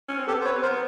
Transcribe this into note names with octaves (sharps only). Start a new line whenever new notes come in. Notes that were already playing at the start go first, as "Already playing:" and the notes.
C#4
C4
B3 G4 A4
C5
B4 C#5
C4
B3 A#4 C5